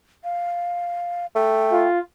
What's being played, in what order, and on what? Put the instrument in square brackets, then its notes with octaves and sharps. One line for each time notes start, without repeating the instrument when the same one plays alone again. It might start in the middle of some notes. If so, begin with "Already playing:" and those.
[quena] F5
[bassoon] A3 [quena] G5
[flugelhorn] F4